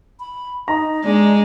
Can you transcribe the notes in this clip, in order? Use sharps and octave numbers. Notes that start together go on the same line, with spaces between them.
B5
D#4 A#5
G#3 D4